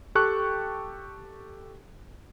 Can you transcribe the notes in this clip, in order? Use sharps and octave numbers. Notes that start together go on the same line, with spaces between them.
G4 A4 G5 A5 C#6 F#6